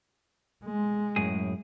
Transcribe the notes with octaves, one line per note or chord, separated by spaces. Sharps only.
G#3
F#2 A2 G#4